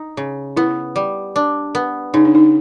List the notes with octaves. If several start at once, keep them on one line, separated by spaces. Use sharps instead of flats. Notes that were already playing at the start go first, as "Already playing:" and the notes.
Already playing: D#4
C#3
B3 E4
G3
D4
B3
C#3 D#4
D4
D#4